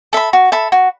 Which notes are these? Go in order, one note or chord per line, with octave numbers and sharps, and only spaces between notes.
A4 E5 B5
F#4
A4 E5 B5
F#4